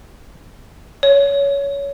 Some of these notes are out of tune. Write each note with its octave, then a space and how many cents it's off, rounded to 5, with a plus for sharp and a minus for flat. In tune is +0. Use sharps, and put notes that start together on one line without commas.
C#5 +20